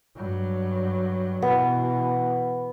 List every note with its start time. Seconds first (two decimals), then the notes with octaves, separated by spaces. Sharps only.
0.16 G2 F#3
1.42 B2 E3 B3